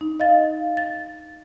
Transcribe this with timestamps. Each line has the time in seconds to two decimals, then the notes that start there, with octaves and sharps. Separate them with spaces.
0.01 D#4
0.20 D#5 F5 A6
0.77 A6